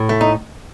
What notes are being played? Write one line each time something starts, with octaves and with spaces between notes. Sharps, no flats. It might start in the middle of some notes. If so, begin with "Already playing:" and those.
Already playing: A2
A3
D#4